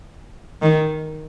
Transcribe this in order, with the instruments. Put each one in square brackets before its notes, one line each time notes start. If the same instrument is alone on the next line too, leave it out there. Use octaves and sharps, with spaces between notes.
[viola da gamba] D#3